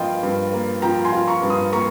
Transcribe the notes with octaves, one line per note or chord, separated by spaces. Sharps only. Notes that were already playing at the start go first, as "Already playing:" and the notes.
Already playing: G2 F3 A#3 F4 D#5 G5
G2
A#3
F3 G5 A#5
G#5 C6
F4
A#5 C#6
G2
C6 D#6
A#3 A#5 C#6